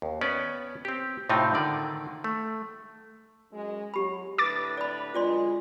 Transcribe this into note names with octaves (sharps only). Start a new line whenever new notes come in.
D#2
B3 C#4 B4 D5
C4 G4
A2 C3 C4 D#4 F4
D3 D#3 D5
A3
F#2 G#3
F#3 G4 B5
A2 D3 B4 D6 A6
D5 B5
F#2 D3 G#3 F4 D5 C6